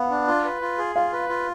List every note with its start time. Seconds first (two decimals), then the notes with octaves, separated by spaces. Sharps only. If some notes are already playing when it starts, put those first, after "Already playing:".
Already playing: B3 F5 F#5
0.10 D4
0.27 F4
0.45 B4
0.61 F4
0.78 G#4
0.96 F4 F5
1.13 B4
1.29 F4